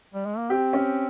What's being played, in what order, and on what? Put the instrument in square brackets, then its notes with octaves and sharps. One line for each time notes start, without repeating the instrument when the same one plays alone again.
[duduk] G3
G#3
A#3
[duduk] C4 [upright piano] G4
[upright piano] C#4